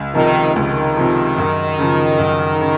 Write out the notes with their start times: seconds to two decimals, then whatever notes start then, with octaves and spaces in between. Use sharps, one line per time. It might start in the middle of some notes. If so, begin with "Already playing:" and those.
Already playing: C#2
0.15 C3 D#3 F3
0.56 C#2 D#3
0.97 C3 F3
1.38 F#2
1.79 C#3 F3
2.19 F#2
2.61 C#3